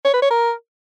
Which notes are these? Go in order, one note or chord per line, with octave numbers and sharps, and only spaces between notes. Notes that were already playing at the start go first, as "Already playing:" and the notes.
C#5
B4
C#5
A#4